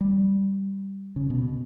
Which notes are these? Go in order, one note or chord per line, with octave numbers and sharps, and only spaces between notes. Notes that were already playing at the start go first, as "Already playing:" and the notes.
G3
C#3
B2